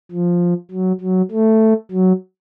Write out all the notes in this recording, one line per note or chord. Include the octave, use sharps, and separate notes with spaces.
F3
F#3
F#3
A3
F#3